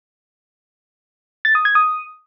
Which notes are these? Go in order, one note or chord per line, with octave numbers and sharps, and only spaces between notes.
A6
D#6
G#6
D#6